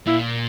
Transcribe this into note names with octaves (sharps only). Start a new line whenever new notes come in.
A#2 E4